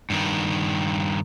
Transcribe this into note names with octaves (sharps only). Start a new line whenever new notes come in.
G2 D#3